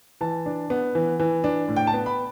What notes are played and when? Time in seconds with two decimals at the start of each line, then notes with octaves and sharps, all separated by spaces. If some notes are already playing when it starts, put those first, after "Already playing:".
0.21 E3 A5
0.46 D4
0.70 B3
0.95 E3
1.20 E3
1.44 D4
1.68 A2
1.76 G5
1.87 A5
1.93 B3
2.06 B5